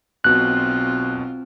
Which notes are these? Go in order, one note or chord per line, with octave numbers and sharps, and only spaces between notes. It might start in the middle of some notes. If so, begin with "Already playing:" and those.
B1 B2 C4 F4 F#6